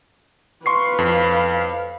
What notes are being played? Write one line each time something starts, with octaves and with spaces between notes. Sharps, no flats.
B4 F5 C6 C#6 C7
F2